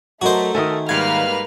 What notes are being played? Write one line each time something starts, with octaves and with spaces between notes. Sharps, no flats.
F#3 A3 F#4 A#4 C5 D#5
D#3 A4 A#4 E5 G#5 D#6
G#2 G3 A#3 B4 F5 F6 G#6